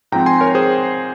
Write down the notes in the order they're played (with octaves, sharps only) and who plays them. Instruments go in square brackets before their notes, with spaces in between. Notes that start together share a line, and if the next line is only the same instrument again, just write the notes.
[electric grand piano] G#2 F3 C4 G5 A#5
G#5 C6
A#4 C#5
G#4 C5